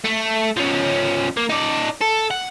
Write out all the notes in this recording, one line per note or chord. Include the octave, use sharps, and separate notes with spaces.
A3
F3 C#4
A#3
D#4 D5
A4
F#5